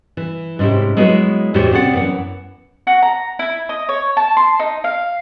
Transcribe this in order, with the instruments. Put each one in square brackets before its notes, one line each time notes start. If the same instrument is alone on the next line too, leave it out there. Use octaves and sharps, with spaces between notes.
[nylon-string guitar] E3
G#2 C3 C#4 E4 G4
F#3 G#3 B3 E4 F#4
E2 A2 F#4 G4 C5 C#5
C3 B3 C4 D5 F#5
F#2 E3 F#5
[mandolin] F#4
A#5
E4
D#5
C#5
A5
C6
D#4
F5